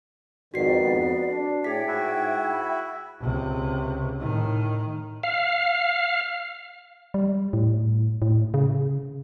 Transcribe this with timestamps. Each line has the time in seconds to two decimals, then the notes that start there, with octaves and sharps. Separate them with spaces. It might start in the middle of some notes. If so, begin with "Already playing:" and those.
0.54 F2 G#2 D#3 F#4 B4 D5 C7
0.82 F2 B3
1.31 D4
1.64 A2 G#4 E5 G5 G#6 B6
1.88 G#2 E4 F#4
2.53 B5
3.20 C#2 C3
4.18 A2 D#3
5.23 F5
7.14 G3
7.53 A2
8.22 A2
8.54 C#3